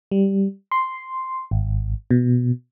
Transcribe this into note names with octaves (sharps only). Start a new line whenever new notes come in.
G3
C6
G#1
B2